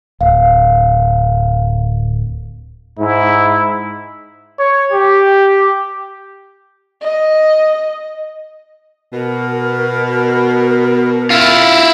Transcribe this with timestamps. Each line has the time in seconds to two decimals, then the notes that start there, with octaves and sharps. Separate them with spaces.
0.21 D1 F5
2.98 G#2 E4
4.59 C#5
4.92 G4
7.02 D#5
9.12 B2 A#4
11.30 E4 F4